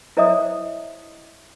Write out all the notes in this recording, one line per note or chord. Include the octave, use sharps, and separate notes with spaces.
E4 C5 C#5 D#5 E5 D#6